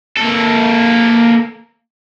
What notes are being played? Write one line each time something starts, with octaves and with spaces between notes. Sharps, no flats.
A#3 A4